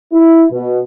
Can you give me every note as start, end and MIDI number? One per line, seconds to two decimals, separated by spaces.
0.13 0.45 64
0.52 0.79 47